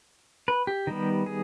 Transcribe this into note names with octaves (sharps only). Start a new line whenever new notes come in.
B4
G4
D#3 G3 B3
G#4